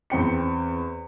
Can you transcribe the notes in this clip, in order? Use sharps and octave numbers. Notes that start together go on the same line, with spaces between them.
E2 C4 G5 C#7